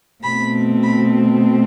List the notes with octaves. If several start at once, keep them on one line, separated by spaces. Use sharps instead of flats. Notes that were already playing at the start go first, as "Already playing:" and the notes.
B2 A3 C4 B5
B5